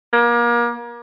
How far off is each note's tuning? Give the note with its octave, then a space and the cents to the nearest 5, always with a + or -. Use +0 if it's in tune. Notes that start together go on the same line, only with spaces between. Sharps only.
A#3 +35